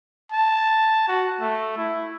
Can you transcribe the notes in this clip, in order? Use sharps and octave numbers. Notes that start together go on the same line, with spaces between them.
A5
F#4
A3
E4